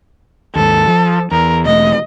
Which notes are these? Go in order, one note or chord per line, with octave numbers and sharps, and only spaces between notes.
D#2 G#2 A4
F3
E2 A#4
E1 A3 D#5